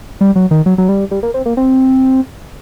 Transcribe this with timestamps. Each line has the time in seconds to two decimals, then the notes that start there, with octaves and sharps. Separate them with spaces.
0.21 G3
0.36 F#3
0.51 D#3
0.66 F#3
0.78 F#3
0.89 G3
1.11 G3
1.23 A#3
1.34 C4
1.46 A#3
1.57 C4